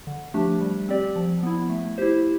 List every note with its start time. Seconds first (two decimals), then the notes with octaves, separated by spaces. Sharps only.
0.07 D3
0.34 F3 A3 D4 G4
0.61 G3
0.89 C4 G4 D5
1.16 F3
1.43 B3 E4
1.69 A3
1.98 E4 G4 C5